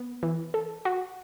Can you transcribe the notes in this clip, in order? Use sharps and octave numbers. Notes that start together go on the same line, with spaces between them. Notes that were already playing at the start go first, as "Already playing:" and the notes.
Already playing: B3
E3
A4
F#4